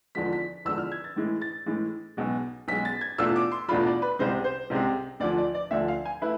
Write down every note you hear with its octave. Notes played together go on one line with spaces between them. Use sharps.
E2 D3 F3 G#3 B6
B6
E2 D3 F3 G#3 E6
F6
G#6
A6
A2 E3 G#3
A6
A2 E3 G#3
B1 B2 G#3
B1 B2 G#3 B6
A6
G#6
E2 B2 A3 D4 F4 E6
D6
C6
E2 B2 A3 D4 F4 B5
D5
B4
C2 C3 G#3 C4 C5
C5
C2 C3 G#3 C4
D2 D3 F3 D5
D5
D5
D2 D3 F3 E5
F5
G#5
A3 E4 B4